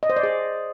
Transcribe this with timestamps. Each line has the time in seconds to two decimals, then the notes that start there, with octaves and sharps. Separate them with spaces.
0.03 D#5
0.10 C5
0.16 D5
0.23 G#4